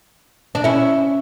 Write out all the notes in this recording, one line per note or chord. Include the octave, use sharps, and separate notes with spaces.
D4
C#4 E4